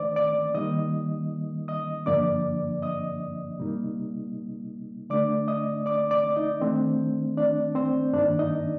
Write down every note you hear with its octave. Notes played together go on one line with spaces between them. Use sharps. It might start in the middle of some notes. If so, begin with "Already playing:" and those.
Already playing: D#3 A3 D4 C5 D5 D6
D5 D6
D#3 G3 A#3 D#4 D#5 D#6
D#5 D#6
G2 D3 F3 A#3 D4 D5 D6
D#5 D#6
C3 G3 A#3 D#4
D3 A3 D4 D5 D6
D#5 D#6
D5 D6
D5 D6
D#4 D#5
D#3 A3 C4 D4 C5
D4 D5
C4 C5
G2 D#3 A#3 D4 D#4 D5
D#4 D#5